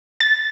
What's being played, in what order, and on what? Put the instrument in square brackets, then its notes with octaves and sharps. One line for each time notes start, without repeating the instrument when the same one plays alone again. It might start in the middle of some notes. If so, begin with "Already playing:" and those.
[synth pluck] A6